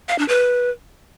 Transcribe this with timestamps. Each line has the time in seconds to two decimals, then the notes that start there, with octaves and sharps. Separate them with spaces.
0.09 F5
0.19 D4
0.28 B4